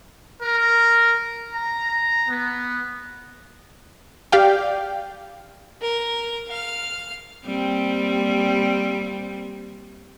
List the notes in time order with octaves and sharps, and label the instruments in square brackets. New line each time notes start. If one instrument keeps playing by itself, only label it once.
[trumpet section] A#4
A#5
B3
[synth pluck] G4 D5 F5 G5
[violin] A#4
F5 F6
[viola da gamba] G3 A#3 C4